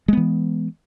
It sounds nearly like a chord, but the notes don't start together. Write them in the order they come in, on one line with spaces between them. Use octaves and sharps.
G#3 B3 E3